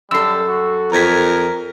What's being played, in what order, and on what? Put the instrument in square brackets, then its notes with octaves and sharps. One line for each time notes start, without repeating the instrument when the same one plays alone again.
[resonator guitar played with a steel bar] F#2 A4 [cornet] G3 [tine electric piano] E6 C7
[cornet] F#4
[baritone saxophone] F2 [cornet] A#4 [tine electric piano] A#5 G#6 B6